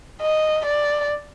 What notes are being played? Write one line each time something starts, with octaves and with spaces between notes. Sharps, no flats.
D#5
D5